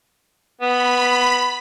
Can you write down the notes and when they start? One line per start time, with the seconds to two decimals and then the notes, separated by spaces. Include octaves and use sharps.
0.61 B3 B5